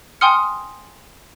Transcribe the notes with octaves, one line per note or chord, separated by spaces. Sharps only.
G5 G#5 C6 D#6 F6 C#7